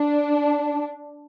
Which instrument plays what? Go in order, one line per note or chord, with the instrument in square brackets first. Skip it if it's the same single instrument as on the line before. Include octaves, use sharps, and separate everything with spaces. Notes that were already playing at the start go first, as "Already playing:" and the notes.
Already playing: [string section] D4